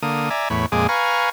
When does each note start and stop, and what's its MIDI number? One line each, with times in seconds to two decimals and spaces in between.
0.02 0.29 50
0.02 0.29 58
0.02 0.29 87
0.30 0.49 74
0.30 0.49 76
0.30 0.49 80
0.30 0.49 82
0.50 0.66 40
0.50 0.66 45
0.50 0.66 73
0.50 0.66 83
0.72 0.87 41
0.72 0.87 46
0.72 0.87 56
0.72 0.87 68
0.72 0.87 86
0.89 1.30 71
0.89 1.30 77
0.89 1.30 80
0.89 1.30 82
0.89 1.30 85